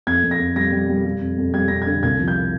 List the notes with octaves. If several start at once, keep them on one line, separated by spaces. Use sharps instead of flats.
F2 G#6
F2
A#6
F2
G3 A#6
G3
G3
G3
F2
F2
G3 G#6
F2 A#6
D3 G#6
C2 G#6
F3
G6